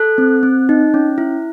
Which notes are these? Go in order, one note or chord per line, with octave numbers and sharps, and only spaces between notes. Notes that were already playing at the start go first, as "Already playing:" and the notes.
Already playing: A4 F#6
C4
C4
D#4
C#4
E4